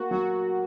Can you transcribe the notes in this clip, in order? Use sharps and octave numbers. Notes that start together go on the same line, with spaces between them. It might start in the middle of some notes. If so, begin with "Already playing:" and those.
Already playing: A#3 F#4
F#3 F#4